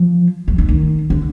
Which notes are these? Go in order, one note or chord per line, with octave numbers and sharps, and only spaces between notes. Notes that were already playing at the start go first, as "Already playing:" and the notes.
Already playing: F3
F#3
D#3
D#3
D3